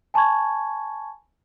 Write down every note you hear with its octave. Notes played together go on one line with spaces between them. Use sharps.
G#5 A5 B5 C#6 G#6